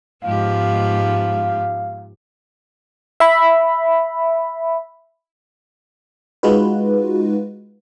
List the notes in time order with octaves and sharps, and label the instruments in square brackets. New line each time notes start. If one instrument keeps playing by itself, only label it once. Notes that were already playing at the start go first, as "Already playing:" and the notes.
[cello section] G#2 [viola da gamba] F3 B3 G4 [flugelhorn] F5
[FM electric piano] E5 B5
G#3 D#4 F4 F#4 B4